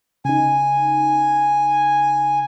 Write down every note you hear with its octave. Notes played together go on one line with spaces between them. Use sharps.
C#3 D#4 G#5